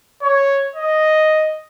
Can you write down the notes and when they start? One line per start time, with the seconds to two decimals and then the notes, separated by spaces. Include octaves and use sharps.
0.22 C#5
0.75 D#5